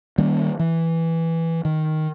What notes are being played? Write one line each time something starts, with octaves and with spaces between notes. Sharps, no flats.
D#3 G3 A#3 C#4
E3
D#3